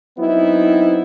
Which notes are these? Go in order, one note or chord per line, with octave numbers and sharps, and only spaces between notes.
F#3 B3 C4 D#4 E4